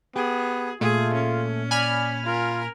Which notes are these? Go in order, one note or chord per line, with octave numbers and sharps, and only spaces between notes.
B3 G4 G#4 G5
A#2 A3 F4 G#4
C#4
D5 G#5 B5 F6
F4 A#4